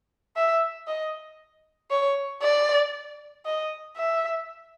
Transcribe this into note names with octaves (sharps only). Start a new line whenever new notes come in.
E5
D#5
C#5
D5
D#5
E5